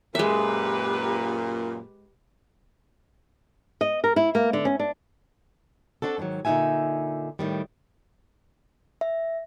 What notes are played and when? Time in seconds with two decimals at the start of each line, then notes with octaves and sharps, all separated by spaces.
0.15 F#2 A#2 G#3 G4 B4 E5
3.81 D#5
4.04 A#4
4.16 E4
4.35 A#3
4.53 D3
4.65 C#4
4.79 D4
6.02 C4 D4 F#4 A4
6.18 G#2 D3 D#3 F#3
6.45 A#2 D3 D#4 F#4 E5 G#5
7.39 A2 D#3 G3
9.01 E5